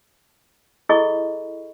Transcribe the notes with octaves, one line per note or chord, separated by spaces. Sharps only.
E4 G#4 A4 D#5 B5 C#6